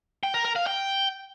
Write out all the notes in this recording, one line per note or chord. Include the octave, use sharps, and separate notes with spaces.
G5
A#4
A#4
F5
G5